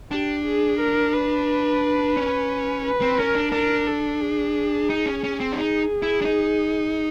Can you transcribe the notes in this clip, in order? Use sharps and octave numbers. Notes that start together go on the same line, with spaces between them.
D4 G4
G#4
A#4
B4
C#4
B4
C4
C#4 A#4
D4
D4 A#4
A4
G#4
D#4
C#4
C#4
C4
D4
D#4 G#4
E4
D4
D#4